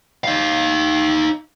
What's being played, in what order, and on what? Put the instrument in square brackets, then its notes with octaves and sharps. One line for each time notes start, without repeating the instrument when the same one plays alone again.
[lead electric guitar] D#4 F5